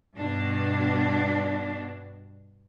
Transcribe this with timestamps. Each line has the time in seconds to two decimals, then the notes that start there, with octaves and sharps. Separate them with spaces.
0.18 G2 B2 D4